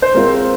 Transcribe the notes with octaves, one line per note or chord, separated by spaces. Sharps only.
C5
G#3 C4 F4 A#4 C5